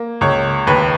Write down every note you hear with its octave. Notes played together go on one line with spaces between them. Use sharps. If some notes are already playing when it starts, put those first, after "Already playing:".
Already playing: A#3
C#2 C#5
D#2 B4